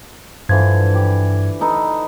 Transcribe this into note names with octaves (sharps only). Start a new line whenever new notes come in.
G2 D3 E3 F3 G#6
G4
D#4 A4 B4